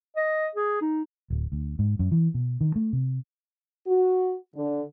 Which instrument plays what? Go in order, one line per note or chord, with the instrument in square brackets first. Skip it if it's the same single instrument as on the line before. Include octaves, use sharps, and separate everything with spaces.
[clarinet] D#5
G#4
D#4
[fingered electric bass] D1
D2
G#2
F#2
E3
B2
D#3
A3
C3
[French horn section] F#4
D3